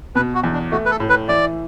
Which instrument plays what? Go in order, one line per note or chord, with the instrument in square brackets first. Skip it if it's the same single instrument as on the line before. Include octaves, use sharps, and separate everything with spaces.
[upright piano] B2 [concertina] B4
[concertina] F#4
[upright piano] E2
[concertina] D4
[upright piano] A3 [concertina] F#4
[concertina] B4
A4
[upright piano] A2
[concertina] B4
[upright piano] E3 [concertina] D5